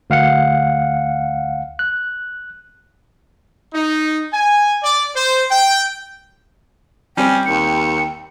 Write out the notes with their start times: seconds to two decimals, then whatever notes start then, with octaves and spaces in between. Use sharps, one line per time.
0.10 D2 F5 F#5 C#7
1.79 F#6
3.73 D#4
4.33 G#5
4.83 D5
5.14 C5
5.50 G5
7.17 G3 C4 C#4 G5
7.46 D#2 C#7